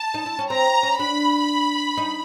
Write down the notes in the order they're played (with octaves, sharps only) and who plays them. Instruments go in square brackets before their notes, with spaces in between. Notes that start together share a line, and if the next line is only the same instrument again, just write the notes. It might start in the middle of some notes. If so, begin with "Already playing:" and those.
Already playing: [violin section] A5
[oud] D#4
E4
C#4
[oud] C4 [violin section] A#5
[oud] C#4
[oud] D4 [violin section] B5
[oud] D#4